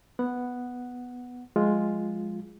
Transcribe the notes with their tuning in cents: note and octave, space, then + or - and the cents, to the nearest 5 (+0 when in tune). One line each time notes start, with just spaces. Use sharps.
B3 +0 F#5 +0
F3 +35 G#3 +0 F4 +0